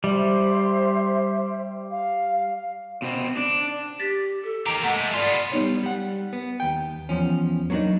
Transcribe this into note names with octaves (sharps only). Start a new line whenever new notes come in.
G3 C5 E5
F5
B2 C4
D4
G4 A6 B6
A4
A#3 G4 A#5 D7 F7
G#3 A3 F#5 A#5
B3 F4 D5 C6
G3 B3 D#4 C#5
G3 F#5
B3
D#2 G5
E2 F3 C#4
F#3 A#3 C4 D4 D#4